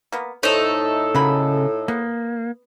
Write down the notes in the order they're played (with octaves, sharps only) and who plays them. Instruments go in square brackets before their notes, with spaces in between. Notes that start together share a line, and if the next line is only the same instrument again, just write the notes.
[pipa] A#3 B3
[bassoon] A2 [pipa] A3 C5 C#5 [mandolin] D#4 A4
[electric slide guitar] C#3 [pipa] F#3 A#3 B5
[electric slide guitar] A#3 [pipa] B3